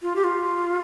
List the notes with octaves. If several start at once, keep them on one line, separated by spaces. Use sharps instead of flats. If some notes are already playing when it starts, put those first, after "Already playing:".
F4
G4
F4